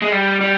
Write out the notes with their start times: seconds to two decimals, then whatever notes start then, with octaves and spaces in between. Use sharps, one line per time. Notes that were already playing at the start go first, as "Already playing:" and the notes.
0.02 G#3
0.12 G3
0.41 G3